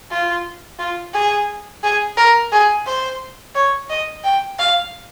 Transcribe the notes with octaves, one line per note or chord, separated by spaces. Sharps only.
F4
F4
G#4
G#4
A#4
G#4
C5
C#5
D#5
G5
F5